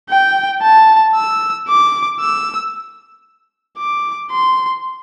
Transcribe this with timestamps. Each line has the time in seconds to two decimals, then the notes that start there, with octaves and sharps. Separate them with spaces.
0.10 G5
0.62 A5
1.16 E6
1.68 D6
2.20 E6
3.78 D6
4.31 C6